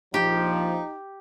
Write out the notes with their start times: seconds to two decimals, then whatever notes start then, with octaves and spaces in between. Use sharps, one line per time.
0.14 A#1 F3 D#4 G4